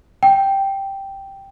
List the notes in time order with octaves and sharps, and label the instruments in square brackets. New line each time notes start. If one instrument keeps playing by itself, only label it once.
[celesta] G5